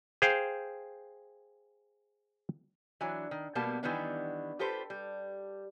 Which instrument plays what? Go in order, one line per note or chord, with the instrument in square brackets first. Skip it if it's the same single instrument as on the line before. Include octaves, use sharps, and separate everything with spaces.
[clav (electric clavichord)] G#4 C5 F5 G5
[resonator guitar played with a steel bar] E3 F#3 D4
D#3
B2 G3 A#3 B3 G4 A5
D#3 E3 G3 B3 D4
F4 G4 A4 B4 C5
G3